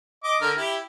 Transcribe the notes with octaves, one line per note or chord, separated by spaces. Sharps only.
D#5 D6
D3 A#4 F6
E4 G4